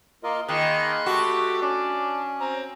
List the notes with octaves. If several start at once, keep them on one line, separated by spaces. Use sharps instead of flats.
A#3 F4 A#4 D#5
D#3 A#3 D#4 G#4 B5 C6 F#6
A3 F#4 G4 C#6
C#4 D4 D5
C4 A#5